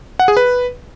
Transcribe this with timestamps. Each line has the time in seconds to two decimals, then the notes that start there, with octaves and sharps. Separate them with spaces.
0.19 F#5
0.28 G#4
0.37 B4